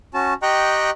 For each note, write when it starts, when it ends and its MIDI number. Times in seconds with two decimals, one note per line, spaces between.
0.14 0.33 61
0.14 0.33 66
0.14 0.33 81
0.42 0.90 67
0.42 0.90 75
0.42 0.90 79
0.42 0.90 82
0.42 0.90 85
0.42 0.90 90